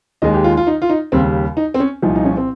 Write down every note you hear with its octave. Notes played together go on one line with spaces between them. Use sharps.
D#2 D#3 G#3 D#5
G4
F4
F4
D#4
F4
D#4
D#2 C#3 G3 C4
D#4
C4
C#4
C2 A#2 F3 D#4
D#4
C#4
C4